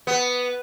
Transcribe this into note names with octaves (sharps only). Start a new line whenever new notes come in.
B3